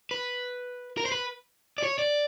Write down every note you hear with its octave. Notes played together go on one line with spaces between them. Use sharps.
B4
A#4
C5
B4
D5
C#5
D5